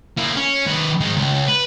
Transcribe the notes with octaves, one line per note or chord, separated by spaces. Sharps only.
A#3 E4
C#4
D#3 B4
D#3 G#3
C#2
B4